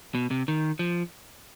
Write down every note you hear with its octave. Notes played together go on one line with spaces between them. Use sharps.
B2
C3
D#3
F3